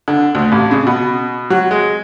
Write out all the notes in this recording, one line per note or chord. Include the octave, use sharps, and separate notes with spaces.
D3
D2
A1
C#3
B2
F#3
G#3